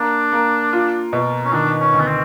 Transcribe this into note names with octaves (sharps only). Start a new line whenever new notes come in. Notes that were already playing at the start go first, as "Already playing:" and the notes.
Already playing: A#3 D4
A#3
F4
B2
C#4
D#3 D4
C#4
D2
B3
C4